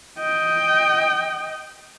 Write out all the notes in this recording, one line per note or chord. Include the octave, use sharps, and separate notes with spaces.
D#5 G5